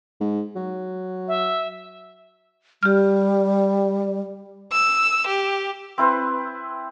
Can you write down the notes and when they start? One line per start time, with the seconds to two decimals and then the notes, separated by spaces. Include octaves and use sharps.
0.20 G#2
0.56 F#3
1.28 E5
2.83 G3 G4 F6
4.72 E6
5.27 G4
5.98 C4 E4 B4 C5